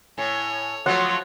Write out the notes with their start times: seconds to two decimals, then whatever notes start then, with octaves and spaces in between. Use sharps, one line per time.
0.18 A2 C#5 G#5
0.86 F3 F#3 A3 C#5 F#5 C6